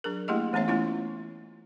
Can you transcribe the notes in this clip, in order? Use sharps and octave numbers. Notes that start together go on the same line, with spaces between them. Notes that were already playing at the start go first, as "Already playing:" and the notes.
F#3 D4 G#4 A#4
A3 A#3 E4 G4 G#4 D#5
E3 A3 B3 C#4 C#5 E5
A3 B3 C#4 E4 F4